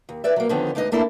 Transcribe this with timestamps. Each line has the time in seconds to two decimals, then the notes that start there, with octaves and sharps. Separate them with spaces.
0.09 D#2
0.24 E2 B4 D5 E5
0.36 F#3 A#3
0.49 D3 D#3 F3 B3 C#4
0.75 D2 G#3 D#4 B4 C5 D#5
0.92 A3 A#3 D4 E4 A4